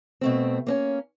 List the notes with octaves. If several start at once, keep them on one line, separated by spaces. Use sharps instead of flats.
B2 A3 C4
A#3 C4 C#4